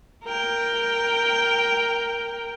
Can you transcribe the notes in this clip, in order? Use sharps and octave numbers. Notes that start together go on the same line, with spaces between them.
A#4 G5